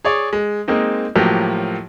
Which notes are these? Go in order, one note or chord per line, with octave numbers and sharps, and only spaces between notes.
G#4 C#5 D5
G#3
G#3 A#3 C4 D#4
A2 F3 F#3 A#3 G4